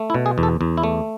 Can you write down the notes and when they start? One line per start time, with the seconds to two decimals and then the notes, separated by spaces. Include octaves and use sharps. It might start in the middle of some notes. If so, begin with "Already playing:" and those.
Already playing: A3
0.10 E4
0.14 B2
0.26 G#4
0.38 E2
0.43 A4
0.61 E2
0.77 E4
0.83 A3